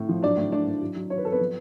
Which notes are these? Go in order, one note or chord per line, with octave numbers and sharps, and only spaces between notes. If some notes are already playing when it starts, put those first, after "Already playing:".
Already playing: A2
F3
F#3 D4 D5
A2
A2 D4 D5
A2
F#3
F#3
F#3 C#5
B4
F#3 A4
B3 B4
F3